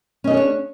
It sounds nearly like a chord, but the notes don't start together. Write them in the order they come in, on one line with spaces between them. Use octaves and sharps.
C#4 D#5 G#4 C#5 D4